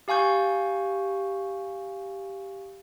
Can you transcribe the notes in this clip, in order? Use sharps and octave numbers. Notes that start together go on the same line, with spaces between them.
G4 F5 G#5 C#6 G6